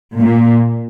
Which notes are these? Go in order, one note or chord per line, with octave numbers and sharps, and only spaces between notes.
A#2